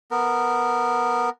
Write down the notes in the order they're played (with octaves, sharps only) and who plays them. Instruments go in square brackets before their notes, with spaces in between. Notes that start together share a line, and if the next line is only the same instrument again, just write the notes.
[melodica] B3 A#4